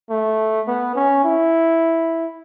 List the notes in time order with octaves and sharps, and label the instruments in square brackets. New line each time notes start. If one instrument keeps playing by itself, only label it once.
[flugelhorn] A3
B3
C#4
E4